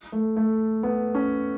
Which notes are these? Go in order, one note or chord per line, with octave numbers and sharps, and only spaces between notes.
A3
A3
B3
C#4